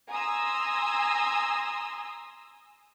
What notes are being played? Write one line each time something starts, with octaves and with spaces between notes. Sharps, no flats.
G#5 A#5 C6 D#6 E6